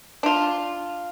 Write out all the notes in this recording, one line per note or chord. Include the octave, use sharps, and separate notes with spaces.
D4 F4